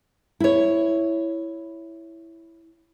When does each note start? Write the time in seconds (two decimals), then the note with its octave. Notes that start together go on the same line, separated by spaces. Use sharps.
0.40 E4 C#5